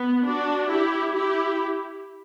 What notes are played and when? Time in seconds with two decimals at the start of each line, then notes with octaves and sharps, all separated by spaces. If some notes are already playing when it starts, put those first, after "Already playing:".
Already playing: B3
0.25 D4 F#4
0.70 E4 G4
1.14 E4 G4